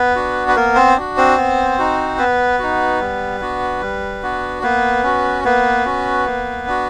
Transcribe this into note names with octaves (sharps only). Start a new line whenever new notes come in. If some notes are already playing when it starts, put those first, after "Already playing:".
Already playing: B3 B4
D4 F#4
B4
A#3 B3 A#4
C4 C5
D4 F#4
C4 C5
B3
D#4 F#4
B3 B4
D#4 F#4
G3
B3 D4 F#4
G3
B3 D4 F#4
A#3 B3 B4
C#4 F#4
A#3 B3 B4
C#4 F#4
A#3
D4 F#4